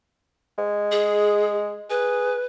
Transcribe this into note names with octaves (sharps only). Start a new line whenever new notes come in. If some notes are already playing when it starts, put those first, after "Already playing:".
G#3
G#4
G#4 B4